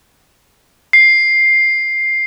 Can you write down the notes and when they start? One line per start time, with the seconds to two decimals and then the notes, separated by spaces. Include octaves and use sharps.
0.93 C7